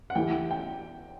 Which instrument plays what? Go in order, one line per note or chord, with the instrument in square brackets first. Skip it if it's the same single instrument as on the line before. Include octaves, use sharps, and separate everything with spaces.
[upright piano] F#5
[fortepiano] E3 A3 E4 G4 [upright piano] G5
[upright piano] G5